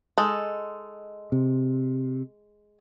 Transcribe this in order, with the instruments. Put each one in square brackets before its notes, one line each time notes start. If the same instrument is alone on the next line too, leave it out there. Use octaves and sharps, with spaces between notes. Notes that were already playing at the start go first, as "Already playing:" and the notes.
[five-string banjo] G#3 D#4 A4
[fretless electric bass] C3